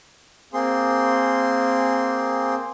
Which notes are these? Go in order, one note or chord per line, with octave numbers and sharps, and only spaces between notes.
A#3 C4 G#4 C6